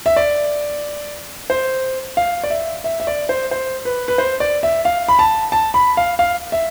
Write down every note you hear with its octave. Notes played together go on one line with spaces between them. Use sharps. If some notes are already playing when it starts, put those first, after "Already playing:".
E5
D5
C5
F5
D5
E5
E5
E5
D5
C5
C5
B4
B4
C5
D5
E5
F5
B5
A5
A5
B5
F5
F5
E5